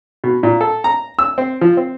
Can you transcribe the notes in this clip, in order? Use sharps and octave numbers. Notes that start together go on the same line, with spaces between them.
B2
A#2
A4
A#5
E6
C4
F3
C4